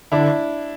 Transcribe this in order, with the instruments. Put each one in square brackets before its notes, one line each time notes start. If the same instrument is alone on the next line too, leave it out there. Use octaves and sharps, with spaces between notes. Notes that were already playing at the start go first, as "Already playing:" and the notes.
[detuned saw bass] D3 [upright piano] D4 E4